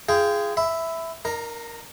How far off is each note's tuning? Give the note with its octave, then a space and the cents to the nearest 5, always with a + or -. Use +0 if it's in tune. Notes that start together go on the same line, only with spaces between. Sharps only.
F4 -30 G#4 +0 G5 +0
E5 +0 B5 +20
D#4 -40 A#4 +0